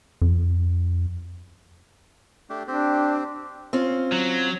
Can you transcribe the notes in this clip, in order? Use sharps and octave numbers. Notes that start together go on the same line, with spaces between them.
F2
A3 D4 G4
C4 D4 G4
C4 C#4 F4
F#3